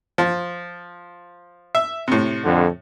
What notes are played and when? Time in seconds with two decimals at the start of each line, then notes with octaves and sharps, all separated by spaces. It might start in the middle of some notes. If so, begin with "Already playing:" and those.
0.18 F3
1.75 E5
2.08 A2 C3
2.44 F2 D3